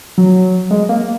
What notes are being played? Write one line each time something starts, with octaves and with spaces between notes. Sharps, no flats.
F#3
G#3
A#3